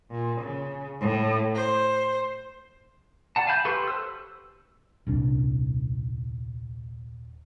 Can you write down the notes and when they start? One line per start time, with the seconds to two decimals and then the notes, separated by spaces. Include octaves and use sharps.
0.11 A#2
0.42 C#3
1.00 A2
1.55 C5
3.36 D5 F#5 A5
3.47 F5 G#5 A5 B5 G6
3.65 G4 A4 B4 C6 C#6
3.88 C5 E6
5.07 D#1 C2 D4